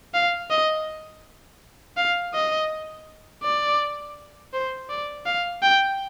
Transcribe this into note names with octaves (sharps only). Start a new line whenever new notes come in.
F5
D#5
F5
D#5
D5
C5
D5
F5
G5